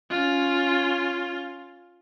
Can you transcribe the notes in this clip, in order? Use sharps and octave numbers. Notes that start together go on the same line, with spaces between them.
C#4 F4